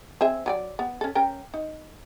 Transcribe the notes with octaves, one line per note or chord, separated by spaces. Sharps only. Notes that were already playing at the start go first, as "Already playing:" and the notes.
C4 G#4 E5
F#3 G#4 D5
B3
C#4 A4
C#4 A#4 G5
D#4